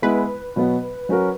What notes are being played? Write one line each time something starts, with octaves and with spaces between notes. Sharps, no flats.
G#3 B3 E4 B4
B2 F#3 B3
F#3 C#4 F#4 A#4